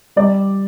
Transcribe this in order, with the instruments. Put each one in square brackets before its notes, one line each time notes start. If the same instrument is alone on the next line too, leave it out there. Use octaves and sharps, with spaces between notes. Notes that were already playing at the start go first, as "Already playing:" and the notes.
[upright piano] G3 D5